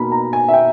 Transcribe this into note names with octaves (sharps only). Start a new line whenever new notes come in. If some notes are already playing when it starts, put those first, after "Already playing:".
Already playing: B2 A#3 D#4 B5
A#5
G#5
E5
G5